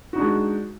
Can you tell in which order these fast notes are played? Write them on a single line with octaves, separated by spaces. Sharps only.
F#4 D#4 D4 G#3